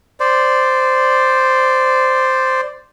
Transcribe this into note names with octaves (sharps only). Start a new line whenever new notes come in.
C5 D5